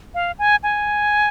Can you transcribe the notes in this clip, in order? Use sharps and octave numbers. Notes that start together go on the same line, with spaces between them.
F5
G#5
G#5